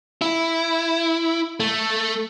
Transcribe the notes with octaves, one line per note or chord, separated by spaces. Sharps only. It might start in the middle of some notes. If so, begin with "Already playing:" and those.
E4
A3